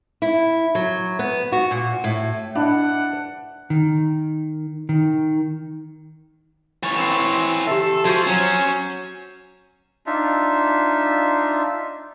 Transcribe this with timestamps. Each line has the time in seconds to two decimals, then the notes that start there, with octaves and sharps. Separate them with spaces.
0.22 E4
0.75 F#3
1.19 B3
1.52 F#4
1.71 A#2
2.04 A2
2.55 D4 E4 D#5 F#5
3.70 D#3
4.89 D#3
6.83 E3 C#5 A6
6.97 C4 C7 E7
7.67 G4 A4 E5
8.05 F3 F#4 C5 C#6 G6 G#6 C7
8.27 F#3 C#4 G#6 E7
10.07 D4 D#4 F4 E5